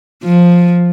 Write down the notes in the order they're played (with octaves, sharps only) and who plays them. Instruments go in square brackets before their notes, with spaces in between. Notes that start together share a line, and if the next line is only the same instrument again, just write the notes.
[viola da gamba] F3